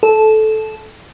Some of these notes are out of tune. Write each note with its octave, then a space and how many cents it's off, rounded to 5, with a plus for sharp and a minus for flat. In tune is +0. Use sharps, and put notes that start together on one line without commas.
A4 -15